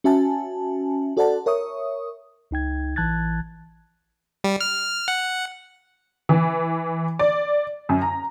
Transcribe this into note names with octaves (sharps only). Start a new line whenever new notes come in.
C#4 F#4 E5 G#5 A5
F#4 A4 C5 D5 F#5 A5
A#4 C#5 E5 C#6 D#6
C#2 D#4 G5 G#6
A1 E3 A5 F#6 G#6 A6
G3
F6
F#5
E3
D5
F#2
A#5